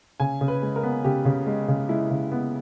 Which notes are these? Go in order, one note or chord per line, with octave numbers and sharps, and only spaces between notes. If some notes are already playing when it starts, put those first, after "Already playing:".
C#3 G#5
C#3
B4
G#3
A#4
B3
C#3 G4
C#3
G#3
C#3
G#3 E4
C#3
B3